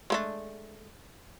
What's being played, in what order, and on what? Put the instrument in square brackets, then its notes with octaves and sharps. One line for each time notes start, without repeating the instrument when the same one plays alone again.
[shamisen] G#3 A3 D4